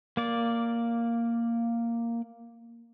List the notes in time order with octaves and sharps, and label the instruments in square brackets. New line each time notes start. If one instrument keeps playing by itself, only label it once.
[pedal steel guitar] A#3 D5